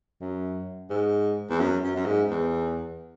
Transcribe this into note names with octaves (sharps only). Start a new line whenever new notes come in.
F#2
G#2
E2
F#2
F#2
F#2
G#2
E2